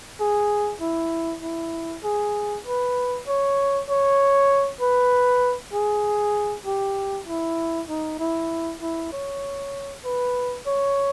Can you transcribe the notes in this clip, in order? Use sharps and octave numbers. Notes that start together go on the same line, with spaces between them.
G#4
E4
E4
G#4
B4
C#5
C#5
B4
G#4
G4
E4
D#4
E4
E4
C#5
B4
C#5